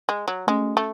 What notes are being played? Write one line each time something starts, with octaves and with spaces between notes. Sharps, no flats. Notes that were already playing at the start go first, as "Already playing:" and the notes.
G#3
F#3
G#3 A3 C#4 F#4
A3